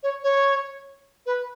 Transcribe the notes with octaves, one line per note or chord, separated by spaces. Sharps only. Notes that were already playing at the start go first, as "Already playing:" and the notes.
C#5
C#5
B4